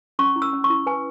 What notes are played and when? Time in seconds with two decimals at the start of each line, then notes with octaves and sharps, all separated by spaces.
0.19 C#4 C#6
0.36 E4
0.42 E6
0.53 C#4
0.64 C#6
0.70 E4
0.86 B4 G#5